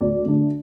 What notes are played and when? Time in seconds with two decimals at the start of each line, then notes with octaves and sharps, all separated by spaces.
0.01 D2 D5
0.25 D3 A3 D4